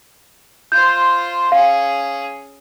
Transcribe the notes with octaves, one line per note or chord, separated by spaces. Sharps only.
F4 C5 G6
C#4 G#4 F5